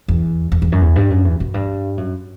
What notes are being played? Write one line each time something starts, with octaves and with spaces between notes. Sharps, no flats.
E2
E2
E2
F#2
E2
G2
F#2
E2
F#2
G2
F#2